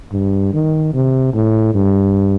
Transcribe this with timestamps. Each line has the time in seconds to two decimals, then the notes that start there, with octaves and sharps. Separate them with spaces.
0.12 G2
0.53 D#3
0.94 C3
1.34 A2
1.74 G2